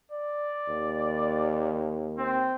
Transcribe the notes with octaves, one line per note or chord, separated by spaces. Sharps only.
D5
D#2
C4